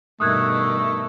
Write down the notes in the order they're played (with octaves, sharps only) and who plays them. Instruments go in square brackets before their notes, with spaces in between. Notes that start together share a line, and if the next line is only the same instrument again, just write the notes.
[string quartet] G2 B2 D#3 [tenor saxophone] A3 [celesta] D#6 F#6 G#6